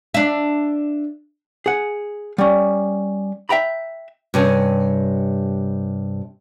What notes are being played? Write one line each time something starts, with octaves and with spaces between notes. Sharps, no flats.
D4 E5
G#4 F#5
G3 C#4
E5 G5 A#5 B5
G2 C3 C#4